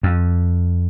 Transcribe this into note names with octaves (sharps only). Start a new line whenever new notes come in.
F2